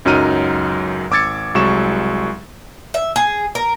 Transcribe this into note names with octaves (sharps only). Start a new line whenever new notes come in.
C#2 F#2 F#3 D#4 F6 D#7
G#1 D6 E6 G#6 A6 C#7
C2 F#3 G#3 C#6 E7
E5
G#4
A#4